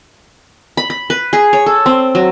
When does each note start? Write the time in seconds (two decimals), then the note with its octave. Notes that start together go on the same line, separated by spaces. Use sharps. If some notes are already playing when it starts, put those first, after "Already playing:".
0.77 B5
0.90 B5
1.10 B4
1.33 G#4
1.53 C#5
1.66 A4
1.86 C4
2.15 F#3